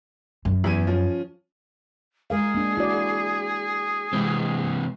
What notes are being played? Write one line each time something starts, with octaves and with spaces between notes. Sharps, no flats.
F#2
E2 E4 D#7
F3 C#4
G#3 G#4 A#4 F5
A#3 D4
E4 F#4 D5
C3 E3 G#3 C4